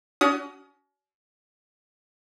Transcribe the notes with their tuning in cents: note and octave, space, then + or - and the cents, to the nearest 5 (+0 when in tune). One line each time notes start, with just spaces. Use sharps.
C#4 +40 F#4 +25 D#6 +15